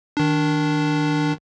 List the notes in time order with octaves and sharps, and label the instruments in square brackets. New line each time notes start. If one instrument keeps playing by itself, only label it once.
[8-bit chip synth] D#3 D4